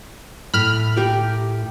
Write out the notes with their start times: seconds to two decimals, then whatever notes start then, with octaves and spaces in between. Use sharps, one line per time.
0.54 A2 B5 F6
0.96 G4 A#4